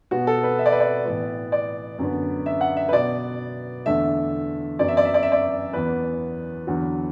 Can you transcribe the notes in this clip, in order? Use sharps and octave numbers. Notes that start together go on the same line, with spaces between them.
B2 B3 F#4
A4
B4
E5
D5
B4
D5
A2 E3 B3
D5
F#2 D3 B3
E5
F#5
E5
B4
B2 B3 D5
E2 D3 A3 E5
F#2 F#3 B3 D5
E5
D5
E5
D5
E5
D5
E2 E3 B3 B4
E2 D3 F#3